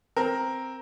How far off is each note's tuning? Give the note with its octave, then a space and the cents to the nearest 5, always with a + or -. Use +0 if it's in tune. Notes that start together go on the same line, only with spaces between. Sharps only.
C4 +0 A#4 +0